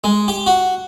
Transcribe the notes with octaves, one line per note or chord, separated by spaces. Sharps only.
G#3
G4
F#4